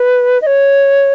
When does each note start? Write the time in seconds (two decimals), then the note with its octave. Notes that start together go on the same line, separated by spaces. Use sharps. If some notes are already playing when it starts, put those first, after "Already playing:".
Already playing: B4
0.41 D#5
0.46 C#5